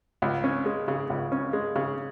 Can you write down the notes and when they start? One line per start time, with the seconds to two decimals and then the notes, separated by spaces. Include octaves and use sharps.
0.22 C#2
0.44 C#4
0.66 G#3
0.88 C#3
1.10 C#2
1.32 C#4
1.53 G#3
1.76 C#3